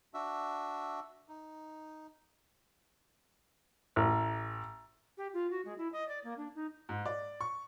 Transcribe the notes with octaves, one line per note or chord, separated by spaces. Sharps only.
D4 F#4 E5
D#4
A1
G4
F4
F#4
G#3
E4
D#5
D5
A#3
D4
D#4
G#2
D5
C#6